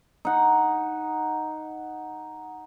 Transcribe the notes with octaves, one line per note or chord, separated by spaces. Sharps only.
D#4 F#5